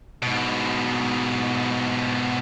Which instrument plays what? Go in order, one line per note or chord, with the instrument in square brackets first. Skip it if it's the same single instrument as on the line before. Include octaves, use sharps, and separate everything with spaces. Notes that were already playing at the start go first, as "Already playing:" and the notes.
[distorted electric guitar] G#2 B2